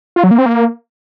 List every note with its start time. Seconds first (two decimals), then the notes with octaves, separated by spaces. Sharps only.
0.16 F4
0.24 F#3
0.31 A#3
0.38 C4
0.46 A#3